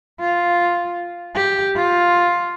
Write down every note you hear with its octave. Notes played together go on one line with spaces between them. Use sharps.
F4
G4
F4